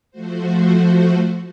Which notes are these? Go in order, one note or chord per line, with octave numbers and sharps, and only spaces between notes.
F3 A3 F#4 C5